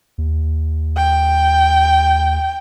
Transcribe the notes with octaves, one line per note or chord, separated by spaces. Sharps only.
D#2
G5